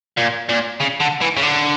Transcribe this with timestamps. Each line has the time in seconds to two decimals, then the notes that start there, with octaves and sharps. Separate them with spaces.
0.18 A#2
0.49 A#2
0.80 C#3
1.00 D3
1.21 E3
1.37 C#3
1.42 D3